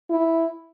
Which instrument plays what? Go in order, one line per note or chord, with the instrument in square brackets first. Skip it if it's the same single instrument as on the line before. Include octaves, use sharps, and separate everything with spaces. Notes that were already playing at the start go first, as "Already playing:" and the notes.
[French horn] E4